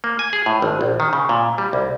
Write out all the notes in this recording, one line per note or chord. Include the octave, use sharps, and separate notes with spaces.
A#3
G#5
G#4
A2
G#1
A#1
D#3
C#3
A#2
G3
C2